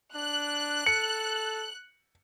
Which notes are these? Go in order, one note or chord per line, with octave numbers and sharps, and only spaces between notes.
D4 F#6
A4 C#7